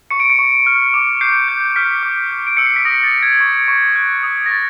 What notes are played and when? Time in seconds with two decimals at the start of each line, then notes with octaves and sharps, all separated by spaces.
0.10 C#6 C#7
0.20 D7
0.30 C#7
0.39 C#6
0.66 F6
0.94 D6
1.21 G6 C7
1.48 G6
1.76 F6 B6
2.03 D6
2.31 G6
2.47 D7
2.57 E6 C#7
2.66 C7
2.76 B6
2.85 D#6 A#6
3.04 A6
3.13 G6
3.23 G#6
3.41 C#6
3.68 C#6
3.95 F#6
4.23 D#6
4.46 A#6
4.50 C#6 A6